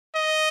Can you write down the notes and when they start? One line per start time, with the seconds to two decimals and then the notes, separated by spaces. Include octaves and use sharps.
0.15 D#5